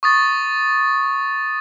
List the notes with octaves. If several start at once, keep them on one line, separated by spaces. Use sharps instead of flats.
C#6 D#6 A6